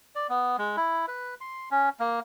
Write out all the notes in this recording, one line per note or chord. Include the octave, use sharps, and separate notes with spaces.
D5
B3
G#3
E4
B4
C6
C#4
A#3